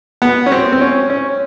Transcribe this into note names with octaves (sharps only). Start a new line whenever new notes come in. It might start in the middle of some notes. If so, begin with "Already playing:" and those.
B3
C#4
C4
C4
C#4
C#4